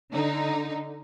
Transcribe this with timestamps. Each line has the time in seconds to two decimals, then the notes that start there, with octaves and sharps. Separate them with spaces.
0.12 D3 D#4